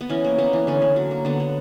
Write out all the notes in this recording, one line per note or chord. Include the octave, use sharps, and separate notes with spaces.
B3
E3 C#4
A#3
A#3 B3
E3
D3 C#4
D3
F#3
A#3
D3 B3
D3